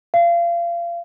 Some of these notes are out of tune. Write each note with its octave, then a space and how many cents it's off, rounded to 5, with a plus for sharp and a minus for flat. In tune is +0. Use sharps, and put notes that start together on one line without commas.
F5 -30